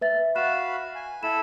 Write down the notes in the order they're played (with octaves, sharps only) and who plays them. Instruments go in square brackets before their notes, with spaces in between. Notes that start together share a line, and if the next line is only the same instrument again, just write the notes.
[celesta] B4 E5 A6
[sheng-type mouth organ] F#4 F5 B5 [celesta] F#6 E7
[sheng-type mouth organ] G#5
[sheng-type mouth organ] E4 A4 B5 [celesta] E7